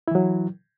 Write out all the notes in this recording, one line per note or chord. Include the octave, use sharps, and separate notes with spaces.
E3 F#3 E4